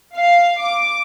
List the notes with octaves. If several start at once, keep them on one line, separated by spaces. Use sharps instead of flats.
F5
D6